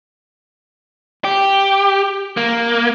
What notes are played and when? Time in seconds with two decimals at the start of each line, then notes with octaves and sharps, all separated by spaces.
1.25 G4
2.37 A#3